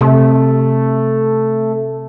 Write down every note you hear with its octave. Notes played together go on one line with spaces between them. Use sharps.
C3 A3